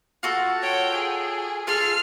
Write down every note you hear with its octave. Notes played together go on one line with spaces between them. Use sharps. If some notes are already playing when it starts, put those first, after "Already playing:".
F4 F#4 A4
C#5 G5
G#4
F4 G#4 A4 F6 C7